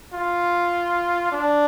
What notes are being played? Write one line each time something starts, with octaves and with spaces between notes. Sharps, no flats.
F4
D4